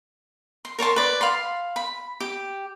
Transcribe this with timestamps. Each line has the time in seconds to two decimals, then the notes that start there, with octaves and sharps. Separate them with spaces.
0.65 C6
0.79 A#4 C#5 A5 C6
0.96 B4 D5
1.21 F5 B5 C6
1.76 B5
2.20 G4